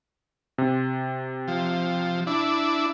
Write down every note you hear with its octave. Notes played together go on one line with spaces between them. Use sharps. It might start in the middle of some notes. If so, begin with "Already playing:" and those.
C3
F3
D4 E4